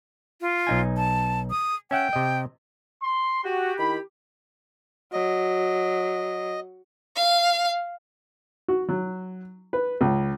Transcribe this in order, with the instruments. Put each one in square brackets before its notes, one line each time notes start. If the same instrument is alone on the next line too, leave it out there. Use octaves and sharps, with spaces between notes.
[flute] F4
[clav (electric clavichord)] B1 D#4 G#5
[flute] A5
D#6
[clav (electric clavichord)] C#4 E5 F#5 [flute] G5
[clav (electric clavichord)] C3 D#5
[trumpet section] C6
[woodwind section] F#4 [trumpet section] G4
[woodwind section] D#3 E4 B5
[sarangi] F#3 [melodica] D#5
[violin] F5
[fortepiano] F#4
F#3
B4
C#2